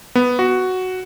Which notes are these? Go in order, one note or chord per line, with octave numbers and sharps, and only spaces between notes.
B3
F#4